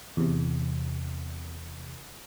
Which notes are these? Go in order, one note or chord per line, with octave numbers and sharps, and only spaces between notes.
E2 C3